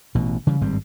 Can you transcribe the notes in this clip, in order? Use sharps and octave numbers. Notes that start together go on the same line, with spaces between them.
A1 B2
C#3 E3 G3
G#1 G2 G3 C4